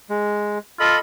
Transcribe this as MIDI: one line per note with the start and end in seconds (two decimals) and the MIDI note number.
0.10 0.58 56
0.80 0.96 65
0.80 0.99 69
0.80 0.99 75
0.80 0.99 83